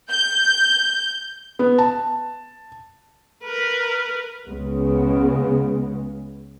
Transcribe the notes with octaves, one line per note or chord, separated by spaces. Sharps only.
G6
B3
A5
A#4 B4
C#2 C#3 G#3 B3